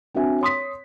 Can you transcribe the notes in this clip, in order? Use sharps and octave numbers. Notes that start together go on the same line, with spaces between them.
C4 D4 F#4 E5 G#5
C#5 C6 D#6 B6